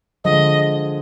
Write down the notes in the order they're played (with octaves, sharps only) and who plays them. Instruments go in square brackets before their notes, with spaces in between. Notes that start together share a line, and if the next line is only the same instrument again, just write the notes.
[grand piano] D3 F3 G#3 [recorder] D#5